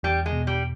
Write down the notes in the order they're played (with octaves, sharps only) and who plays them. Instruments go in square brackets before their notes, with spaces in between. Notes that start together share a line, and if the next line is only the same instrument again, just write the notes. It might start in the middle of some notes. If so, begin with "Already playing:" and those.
[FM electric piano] E2 [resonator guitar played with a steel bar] G3
[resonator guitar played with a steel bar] G#3
[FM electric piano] B2
[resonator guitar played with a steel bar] G3